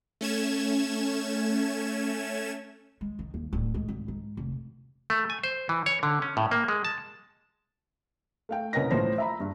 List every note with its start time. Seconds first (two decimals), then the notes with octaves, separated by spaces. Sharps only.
0.21 A3 C#4 G#6 E7
3.01 G#3
3.19 D#3
3.34 D#2
3.53 D1
3.74 G#3
3.88 G#1
4.08 G#2
4.37 F1
5.10 A3
5.30 G#5
5.44 C5
5.69 E3
5.86 C#5
6.03 D3
6.22 C#4
6.37 A2
6.51 A#3
6.68 G#3
6.85 A5
8.49 A3 F5 G5
8.73 C2 C#4 A#4 B4 D#5 A#6
8.90 A2 F3 C5 A#6
9.18 E5 A#5 B5
9.40 G2